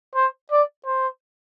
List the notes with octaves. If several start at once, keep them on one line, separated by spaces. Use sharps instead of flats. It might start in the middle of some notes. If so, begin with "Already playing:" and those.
C5
D5
C5